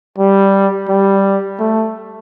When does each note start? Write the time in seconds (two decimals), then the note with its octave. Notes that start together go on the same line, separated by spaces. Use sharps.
0.18 G3
0.89 G3
1.59 A3